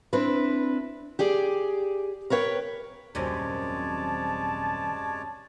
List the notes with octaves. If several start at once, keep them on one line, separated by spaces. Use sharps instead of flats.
C4 D4 E4 B4
G4 G#4 D5
A#4 B4 C#5 F5 G5
D#1 F#2 C3 G#3 C#4 C#5 D5 A5